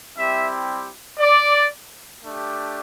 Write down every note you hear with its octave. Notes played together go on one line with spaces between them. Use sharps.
G3 C4 E4 G4 E5
D5
A3 D4 G4